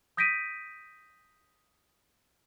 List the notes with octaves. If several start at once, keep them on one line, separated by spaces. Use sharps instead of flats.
D#6 G6 A#6 B6 D7 D#7